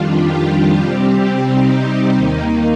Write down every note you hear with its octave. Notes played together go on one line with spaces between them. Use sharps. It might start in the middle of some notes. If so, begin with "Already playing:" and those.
Already playing: F2 D#3 G3 D4 F4
G4
C3 G3 C4
D#4
D#2 D#3 A#3 D#4